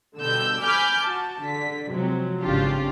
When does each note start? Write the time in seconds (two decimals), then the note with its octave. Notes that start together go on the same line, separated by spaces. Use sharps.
0.20 B2 D3 G3 E6 G6
0.62 G#5 B5 D6 F6 G6
1.03 F#4 A5
1.41 D3 B6
1.91 C3 F3 F#3 G#3
2.41 G#1 C#3 D4 F4 G4